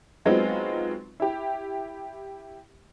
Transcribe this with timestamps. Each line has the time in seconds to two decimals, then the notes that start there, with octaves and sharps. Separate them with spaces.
0.25 F#3 G#3 B3 C4 D#4 F4
1.20 E4 G4